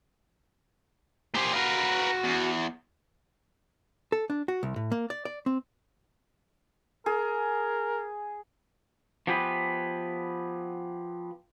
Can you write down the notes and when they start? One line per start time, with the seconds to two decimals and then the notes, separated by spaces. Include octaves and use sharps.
1.34 A#3 G4 G#4 C5
1.53 F#4 A#4 B4 F5
2.24 E2
4.12 A4
4.30 D4
4.48 F#4
4.63 C2
4.76 A2
4.92 A#3
5.10 D5
5.25 D5
5.46 C4
7.06 G#4 A#4
9.27 F3 B3 G4 G#4 B4